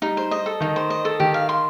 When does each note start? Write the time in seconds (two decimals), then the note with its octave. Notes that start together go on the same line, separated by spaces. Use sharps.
0.02 G3 D#4
0.17 C5
0.31 D#5
0.46 A4
0.61 D#3 D#4
0.76 C5
0.90 D#5
1.05 A4
1.20 D#3 G4
1.34 F5
1.49 C6